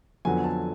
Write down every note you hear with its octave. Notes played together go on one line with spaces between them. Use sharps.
F2 D3 F#3 B3 G#5
A5